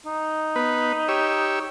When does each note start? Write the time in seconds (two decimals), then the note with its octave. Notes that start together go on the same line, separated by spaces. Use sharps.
0.06 D#4
0.56 B3 B4
1.08 G4 C#5 E6